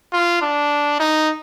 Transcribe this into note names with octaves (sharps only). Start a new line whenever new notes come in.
F4
D4
D#4